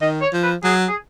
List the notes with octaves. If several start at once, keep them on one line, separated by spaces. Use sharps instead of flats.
D#3 D#5
C#5
F3
B4
F#3 G#4
G#4